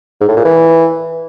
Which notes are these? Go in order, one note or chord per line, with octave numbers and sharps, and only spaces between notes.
G#2
A2
A#2
E3